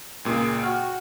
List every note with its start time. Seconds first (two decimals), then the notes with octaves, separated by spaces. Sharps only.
0.25 C#2 A#2 G#4
0.63 F#4 G5 F6